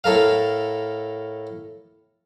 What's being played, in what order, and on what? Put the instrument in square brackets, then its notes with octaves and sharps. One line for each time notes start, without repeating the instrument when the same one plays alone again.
[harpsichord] A2 A4 A#4 F5